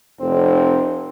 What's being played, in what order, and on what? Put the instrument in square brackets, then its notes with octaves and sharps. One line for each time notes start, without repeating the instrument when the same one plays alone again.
[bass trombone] F1 [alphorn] C4